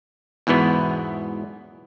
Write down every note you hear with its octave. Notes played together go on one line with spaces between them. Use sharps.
E2 G#2 B2 E3 B3